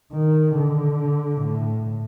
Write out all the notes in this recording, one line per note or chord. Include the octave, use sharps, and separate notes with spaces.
D#3
D3
A2